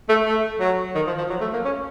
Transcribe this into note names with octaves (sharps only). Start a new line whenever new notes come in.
A3
A3
F#3
D#3
F3
F3
F#3
A3
A#3
C#4